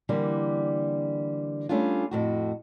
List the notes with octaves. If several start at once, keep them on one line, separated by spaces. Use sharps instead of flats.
D3 E3 G3 A#3
G3 A3 C#4 D4 F4
F2 A2 F#4